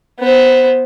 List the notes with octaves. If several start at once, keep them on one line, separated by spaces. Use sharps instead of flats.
B3 C5